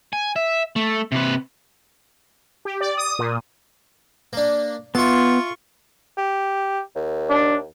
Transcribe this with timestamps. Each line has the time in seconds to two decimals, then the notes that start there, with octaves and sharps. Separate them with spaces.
0.13 G#5
0.36 E5
0.76 A3
1.12 C3 B4
2.65 G4
2.81 D5
2.97 D#6
3.19 A#2
4.33 A#3 D4
4.95 B3 F4 A4 E5 C6 C#6
6.18 G4
6.95 D#2
7.30 D4